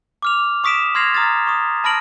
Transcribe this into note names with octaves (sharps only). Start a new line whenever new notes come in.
D6 F6 F7
C#6 D#6 B6 D7 E7
C6 F6 G#6 A#6 C7 F7
A#5 D#6 F6 A6
C#6 D#6
A5 B5 F6 A#6 D7 F#7